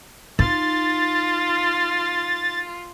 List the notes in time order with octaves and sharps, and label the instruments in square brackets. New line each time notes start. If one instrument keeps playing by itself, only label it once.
[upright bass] D#4 [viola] F4 [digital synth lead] A6